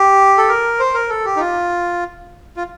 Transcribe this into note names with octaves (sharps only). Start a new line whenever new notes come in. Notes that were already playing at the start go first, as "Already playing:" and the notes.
Already playing: G4
A4
A#4
C5
A#4
A4
G4
D#4
F4
F4